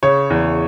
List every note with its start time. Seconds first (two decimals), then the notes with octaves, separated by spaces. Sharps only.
0.03 C#3 C#5
0.30 E2